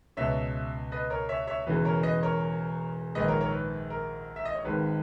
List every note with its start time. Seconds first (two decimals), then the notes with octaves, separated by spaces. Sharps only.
0.17 C#2 B2 C#5 E5
0.92 B4 D#5
1.10 A#4 C#5
1.29 C#5 E5
1.47 C#5 E5
1.66 E1 E2 C#3 E3 B4
1.85 A#4 C#5
2.03 B4 D#5
2.23 A#4 C#5
3.15 A#1 G#2 D#3 B4 D#5
3.28 A#4 C#5
3.41 A#4 C#5
3.52 B4
3.90 A#4
4.36 E5
4.45 D#5
4.55 C#5
4.65 G#1 G#2 D#3 B4